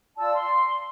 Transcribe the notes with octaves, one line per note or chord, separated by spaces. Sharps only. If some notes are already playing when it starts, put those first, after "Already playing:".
F4 D5 A5 E6
C6